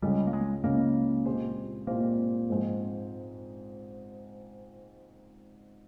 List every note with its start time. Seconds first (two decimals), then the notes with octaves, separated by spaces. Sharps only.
0.02 C#2 C#3 G3 G#3 C#4
0.27 A#3
0.33 G#3
0.64 C#2 C#3 G#3 A#3 C#4
1.25 A#2 G#3 C4 G4 C5
1.87 A#2 G#3 A#3 C4 G4 C5
2.49 G#2 F3 G#3 C4